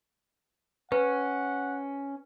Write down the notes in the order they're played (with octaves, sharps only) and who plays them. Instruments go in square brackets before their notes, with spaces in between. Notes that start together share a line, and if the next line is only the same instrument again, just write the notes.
[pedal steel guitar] C#4 [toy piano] B4 [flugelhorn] F#5